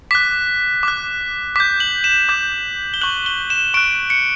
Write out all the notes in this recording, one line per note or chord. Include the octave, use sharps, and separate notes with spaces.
D6 F#6 B6
D6 F#6
D6 G6 B6
F#7
E7
D6 G6
G7
C#6 F#6 F#7
G7
E7
C#6 F#6 D7
C#7